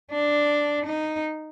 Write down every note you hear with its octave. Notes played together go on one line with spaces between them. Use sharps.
D4
D#4